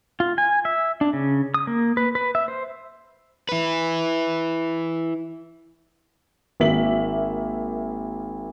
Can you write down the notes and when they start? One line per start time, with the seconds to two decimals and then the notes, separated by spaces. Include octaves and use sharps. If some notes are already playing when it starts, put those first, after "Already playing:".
0.20 F4
0.38 G#5
0.65 E5
1.01 D4
1.13 C#3
1.54 D#6
1.67 A#3
1.97 B4
2.15 B4
2.35 E5
2.48 C5
3.49 E4 B4
6.60 G#1 A#3 E5 B6 F#7